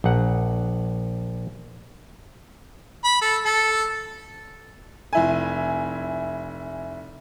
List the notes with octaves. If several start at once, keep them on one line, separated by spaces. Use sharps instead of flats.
A#1 F#5
B5
A4
A4
F1 E4 G#5